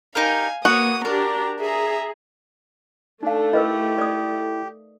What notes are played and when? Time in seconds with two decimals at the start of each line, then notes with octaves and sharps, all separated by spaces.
0.15 D#4 G4 A#4 F5 G#5
0.65 A#3 B3 F#4 C#5 D#6
1.05 D4 G4 A#4 A#5
1.61 G#4 E5 A#5
3.23 A3 D4 D#4 F5
3.53 E4 G4 A#4 B4 D#5
3.98 D5 D#6